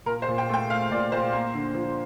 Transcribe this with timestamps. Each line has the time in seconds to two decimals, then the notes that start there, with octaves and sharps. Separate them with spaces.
0.06 A#2 A#4
0.22 C5
0.28 A#2
0.38 G5
0.49 A3 G5
0.69 A3 F5
0.90 A#2 D5
1.12 A#2 C5
1.33 A#3
1.55 D3
1.75 F3